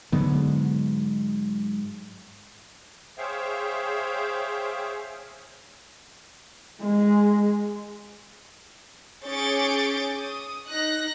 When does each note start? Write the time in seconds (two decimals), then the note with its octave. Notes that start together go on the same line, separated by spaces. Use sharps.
0.12 G#2 D3 F#3 G#3 B3
3.18 G#4 C5 C#5 E5 F5 G5
6.81 G#3
9.25 C#4 G#4 C#6 D6 G6 A6
10.16 D#6
10.68 D#4 F#6 A#6